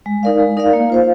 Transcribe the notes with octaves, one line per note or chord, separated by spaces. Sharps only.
G#3
D#4 A#4 D5 F5
G#3
D#4 A#4 D5 F5
A#3
F4 C5 F5